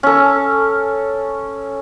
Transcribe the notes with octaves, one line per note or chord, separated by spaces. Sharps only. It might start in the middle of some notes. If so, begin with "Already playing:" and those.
C#4 A4